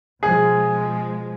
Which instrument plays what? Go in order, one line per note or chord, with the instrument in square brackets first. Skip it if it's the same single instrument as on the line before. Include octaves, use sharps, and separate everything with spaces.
[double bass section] B2 F3 G#3 [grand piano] G#4